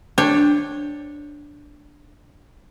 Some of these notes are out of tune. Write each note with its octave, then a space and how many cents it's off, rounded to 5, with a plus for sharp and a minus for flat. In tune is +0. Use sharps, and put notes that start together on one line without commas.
D4 +0 C#5 -10 G5 +20